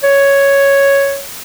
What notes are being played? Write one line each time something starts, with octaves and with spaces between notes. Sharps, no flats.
C#5